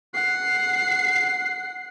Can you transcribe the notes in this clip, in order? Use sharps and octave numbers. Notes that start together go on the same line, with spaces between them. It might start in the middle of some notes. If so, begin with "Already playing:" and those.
F#5 C7